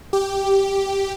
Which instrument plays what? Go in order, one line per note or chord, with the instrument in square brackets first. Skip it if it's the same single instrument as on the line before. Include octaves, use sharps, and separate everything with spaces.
[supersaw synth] G4